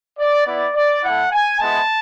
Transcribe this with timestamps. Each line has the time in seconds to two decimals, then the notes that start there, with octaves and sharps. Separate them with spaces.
0.18 D5
0.46 B3 E4 D5
0.74 D5
1.02 A3 E4 F#5
1.31 G#5
1.60 G#3 B3 E4 A5